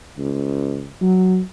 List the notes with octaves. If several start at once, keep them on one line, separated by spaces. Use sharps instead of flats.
C#2
F#3